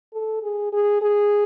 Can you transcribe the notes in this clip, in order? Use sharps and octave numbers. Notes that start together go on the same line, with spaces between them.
A4
G#4
G#4
G#4